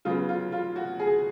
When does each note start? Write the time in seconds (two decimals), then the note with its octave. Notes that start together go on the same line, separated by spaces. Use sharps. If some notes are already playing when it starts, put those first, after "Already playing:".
0.05 C#3 F#3 B3 F4
0.29 F4
0.52 F4
0.76 F#4
1.00 G#4